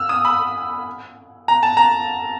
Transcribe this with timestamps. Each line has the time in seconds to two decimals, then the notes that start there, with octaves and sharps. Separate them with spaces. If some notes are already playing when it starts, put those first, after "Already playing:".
Already playing: E6 F6
0.09 D#6
0.25 B5
1.48 A#5
1.63 A5
1.77 A#5